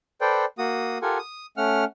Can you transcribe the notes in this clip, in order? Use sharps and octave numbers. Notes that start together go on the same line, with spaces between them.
A4 B4 C5 D5 G5
A#3 F#4 D#6
F4 G4 A4 A#4 F#5 G#5
D#6
A3 C#4 F#5 F6